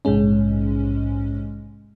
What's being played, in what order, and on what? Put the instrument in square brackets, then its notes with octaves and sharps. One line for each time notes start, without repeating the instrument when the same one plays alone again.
[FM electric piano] A#1 G#2 C3 G#3 C#4